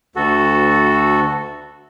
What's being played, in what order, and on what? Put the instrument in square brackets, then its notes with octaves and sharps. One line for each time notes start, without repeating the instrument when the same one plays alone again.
[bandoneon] D2 F#4 A4